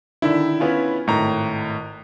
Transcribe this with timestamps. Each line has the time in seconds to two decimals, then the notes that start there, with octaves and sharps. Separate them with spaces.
0.22 D3 D#3 D4 E4 E5
0.60 B3 C#4 F4
1.08 G#1 A2 A#5